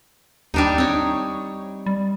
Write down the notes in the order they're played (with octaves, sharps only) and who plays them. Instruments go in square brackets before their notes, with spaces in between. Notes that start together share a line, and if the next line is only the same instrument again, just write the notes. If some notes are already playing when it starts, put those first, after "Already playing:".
[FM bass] D#2 [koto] G3 D4 D#4
[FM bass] C4 [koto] D#4 C#5
[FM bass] G3